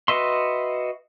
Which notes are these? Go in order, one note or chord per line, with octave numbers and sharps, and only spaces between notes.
F#4 B4 D#5 E5 C6